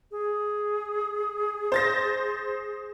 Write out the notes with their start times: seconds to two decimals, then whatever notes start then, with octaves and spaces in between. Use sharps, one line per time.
0.11 G#4
1.72 C5 A6 A#6